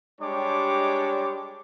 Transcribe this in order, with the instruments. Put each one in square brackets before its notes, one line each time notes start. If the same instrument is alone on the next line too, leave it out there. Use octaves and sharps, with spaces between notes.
[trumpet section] G3 G#3 D4 G4 C#5 D6